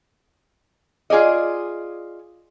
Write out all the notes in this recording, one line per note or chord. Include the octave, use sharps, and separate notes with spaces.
F4 G#4 D5 D#5